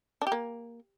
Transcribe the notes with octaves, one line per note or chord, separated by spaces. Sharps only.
D4
G4
A#3